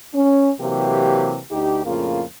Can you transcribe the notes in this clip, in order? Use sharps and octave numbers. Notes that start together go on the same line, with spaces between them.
C#4
C3 E3 F#3 A#3 G4
D2 D#4 G4
F2 A2 C#3 A#3 F4